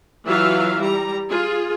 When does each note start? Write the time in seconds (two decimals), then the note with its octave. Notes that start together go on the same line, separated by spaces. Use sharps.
0.25 E3 F#3 F4 E5 F5
0.81 G3 A#5
1.29 F4 G#4